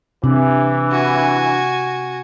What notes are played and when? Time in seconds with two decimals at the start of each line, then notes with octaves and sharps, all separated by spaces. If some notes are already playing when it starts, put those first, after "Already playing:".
0.24 C3 E3 D4
0.91 F#4 G#5